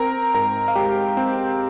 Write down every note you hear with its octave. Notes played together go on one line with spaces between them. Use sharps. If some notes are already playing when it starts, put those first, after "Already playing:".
Already playing: C4 A#4 A#5
G#2 A#4 A#5
F5
G#3 G4 G5
C4